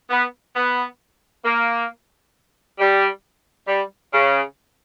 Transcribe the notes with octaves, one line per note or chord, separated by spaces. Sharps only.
B3
B3
A#3
G3
G3
C#3